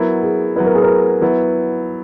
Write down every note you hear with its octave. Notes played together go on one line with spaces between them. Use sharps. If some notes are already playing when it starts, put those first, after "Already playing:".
Already playing: F#3 B3 E4 A#4
G#4
F#3 B3 E4 B4
A#4
G#4
A#4
F#3 B3 E4 B4